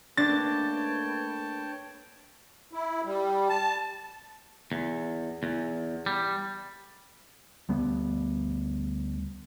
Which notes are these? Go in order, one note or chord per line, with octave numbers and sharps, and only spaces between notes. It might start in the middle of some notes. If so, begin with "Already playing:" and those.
A3 A#3 D4 B4 C#5 G5 A5 A6
E4
G3
A5
E2
E2
G3
D2 G3 B3